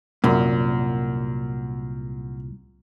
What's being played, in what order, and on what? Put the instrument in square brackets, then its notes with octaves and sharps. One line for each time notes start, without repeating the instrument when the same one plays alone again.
[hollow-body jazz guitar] C2 A#2 [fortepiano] F#2